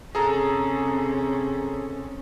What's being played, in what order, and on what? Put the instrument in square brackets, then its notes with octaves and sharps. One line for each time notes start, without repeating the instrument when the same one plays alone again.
[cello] C3 C#4 [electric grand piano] G#4 A4 A#5